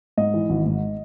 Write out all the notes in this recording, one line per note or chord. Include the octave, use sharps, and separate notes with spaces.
G#2 D#5
E3
G#1
G#2